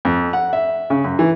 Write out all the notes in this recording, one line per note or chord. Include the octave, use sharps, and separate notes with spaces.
F2
F#5
E5
C#3
F#2
E3